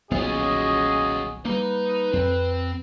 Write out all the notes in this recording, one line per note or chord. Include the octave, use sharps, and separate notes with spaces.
D#1 B1 B3 C#4 F4 F#4 G#4 D#5
G3 A#3 D#4 B4 A#5
F2 C4